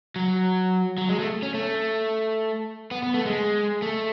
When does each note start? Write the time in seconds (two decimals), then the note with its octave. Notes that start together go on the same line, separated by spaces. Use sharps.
0.16 F#3
0.98 F#3
1.09 G#3
1.19 A3
1.43 C#4
1.54 A3
2.91 B3
3.03 B3
3.14 A3
3.26 G#3
3.82 A3